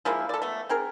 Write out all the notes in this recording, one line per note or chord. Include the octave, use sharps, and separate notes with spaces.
F3 G#3 A#3 E4
A4 D5
A3 B3
C4 G#4 A#4